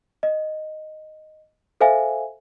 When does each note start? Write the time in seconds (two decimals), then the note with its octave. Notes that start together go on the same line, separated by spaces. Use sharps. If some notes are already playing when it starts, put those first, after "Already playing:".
0.23 D#5
1.81 A4 C5 E5 F5 G#5